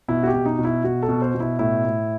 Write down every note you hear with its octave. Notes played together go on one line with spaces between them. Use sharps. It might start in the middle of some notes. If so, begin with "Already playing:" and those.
B2 E4
F#4
G4
B2
D#4
B2
E4
B2 F#4
A4
B2
C5
B2
E4
A2 E4
A2